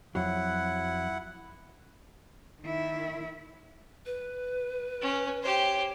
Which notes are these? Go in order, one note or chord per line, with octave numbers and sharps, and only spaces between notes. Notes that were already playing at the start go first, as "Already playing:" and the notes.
F2 F#3 E4 F#5
D#3 E4
B4
C#4
G4 C5 C#5